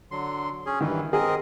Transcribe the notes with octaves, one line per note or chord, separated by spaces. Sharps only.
D3 F#3 C6
C#4 G#4
G2 D#3 E3
C4 G#4 A#4 D#5